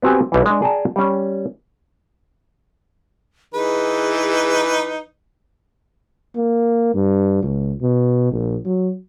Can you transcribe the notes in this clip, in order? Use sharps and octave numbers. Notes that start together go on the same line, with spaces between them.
B3 C4 F#4 G4 G#5
B1 E3
G#3 D4
G#4 D5 G5 A5 A#5
G3 C#4
E3 D#4 G#4 B4
A#3
G2
C#2
B2
A#1
F#3